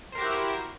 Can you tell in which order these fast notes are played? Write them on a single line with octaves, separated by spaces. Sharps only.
C5 A#4 G4 F#4 E4